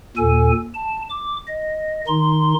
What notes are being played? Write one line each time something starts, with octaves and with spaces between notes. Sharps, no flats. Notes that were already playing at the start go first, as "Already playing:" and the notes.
D#2 A#2 A4 G#5
A5
D6
D#5
D#3 D#4 C6